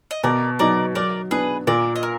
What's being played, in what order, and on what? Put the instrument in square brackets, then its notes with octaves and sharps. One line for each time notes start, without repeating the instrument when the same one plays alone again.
[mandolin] D#5
[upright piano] B2 [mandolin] A#4 D5
[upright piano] F#3 B3 D#4 [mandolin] A#4 D5
[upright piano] F#3 [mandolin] A#4 D5
[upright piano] B3 D4 [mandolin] G#4 B4
[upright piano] A#2 [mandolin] A#4 D5
[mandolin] D#5
A#4